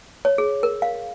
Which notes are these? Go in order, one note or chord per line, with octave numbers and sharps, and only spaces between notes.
C#5
G#4
A#4
F5